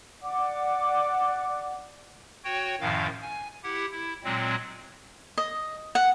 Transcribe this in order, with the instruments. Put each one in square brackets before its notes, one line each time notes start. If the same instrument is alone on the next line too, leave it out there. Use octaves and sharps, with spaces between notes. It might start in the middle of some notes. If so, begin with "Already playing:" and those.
[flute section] D5 F#5 D6
[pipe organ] F#4 C#5 G5
F#2 A2 D#3 F3 F5
G#5
E4 G4 F#5
E4
A#2 F#3 G#3 C4
[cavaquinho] D#5
F#5